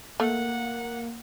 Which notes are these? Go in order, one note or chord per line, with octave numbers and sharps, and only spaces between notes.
A3 A#3 F#5